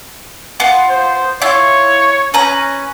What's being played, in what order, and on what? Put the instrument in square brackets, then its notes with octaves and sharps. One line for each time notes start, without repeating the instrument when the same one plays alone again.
[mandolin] B3 F4
[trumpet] C5
[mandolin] E4 F4 [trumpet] C#5
[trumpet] C#4 [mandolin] B4 A#5